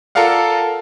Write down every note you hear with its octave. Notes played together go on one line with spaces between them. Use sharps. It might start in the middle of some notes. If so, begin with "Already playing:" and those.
F4 A4 A#4 D5 F5 F#5